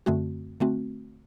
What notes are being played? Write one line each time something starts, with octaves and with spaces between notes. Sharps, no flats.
F#2 D3 A3 C4 F#4
D3 A3 C4 F#4